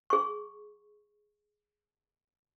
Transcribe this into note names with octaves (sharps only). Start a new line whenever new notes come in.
G#4 C#6